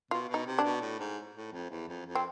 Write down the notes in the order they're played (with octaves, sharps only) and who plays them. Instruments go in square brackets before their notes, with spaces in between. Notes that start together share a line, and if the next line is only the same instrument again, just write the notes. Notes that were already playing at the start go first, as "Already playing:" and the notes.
[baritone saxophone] B2 [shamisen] F4
[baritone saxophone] B2
[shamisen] D#4
[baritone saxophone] C3
[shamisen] D4
[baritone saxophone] B2
A2
G#2
A2
F2
E2
F2
F2
[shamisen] C4